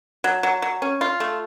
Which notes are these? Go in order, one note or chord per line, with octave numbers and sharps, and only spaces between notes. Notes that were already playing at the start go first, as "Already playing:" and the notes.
F#3
F#3
F#3
C#4
F4
A3